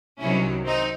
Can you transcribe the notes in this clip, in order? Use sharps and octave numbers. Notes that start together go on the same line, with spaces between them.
C2 C3 D#3 F#3 C#4 E4
C4 D#4